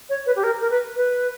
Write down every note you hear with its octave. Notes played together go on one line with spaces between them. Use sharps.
C#5
B4
G4
A#4
A#4
B4
B4